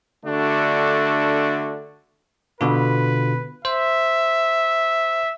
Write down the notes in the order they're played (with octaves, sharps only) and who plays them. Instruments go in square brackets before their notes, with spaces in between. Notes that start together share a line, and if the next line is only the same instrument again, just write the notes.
[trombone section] D3 A3 D4 F#4
[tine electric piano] B2 D3 F4 [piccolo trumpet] B4
[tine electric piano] C5 [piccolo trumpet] E5